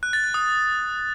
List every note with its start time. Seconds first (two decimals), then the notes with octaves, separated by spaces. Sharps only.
0.03 F#6
0.13 A6
0.24 F#6
0.34 D#6